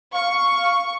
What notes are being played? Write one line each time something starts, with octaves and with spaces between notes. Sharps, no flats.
F5 C#6